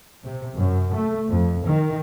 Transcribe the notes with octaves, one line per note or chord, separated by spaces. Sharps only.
C3
F#2
A3
F2
D#3